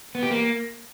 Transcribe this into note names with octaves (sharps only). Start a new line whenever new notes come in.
B3
G4
A#3